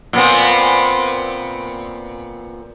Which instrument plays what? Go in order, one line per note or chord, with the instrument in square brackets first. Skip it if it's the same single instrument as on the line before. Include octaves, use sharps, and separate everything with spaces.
[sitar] A#2 B3 C4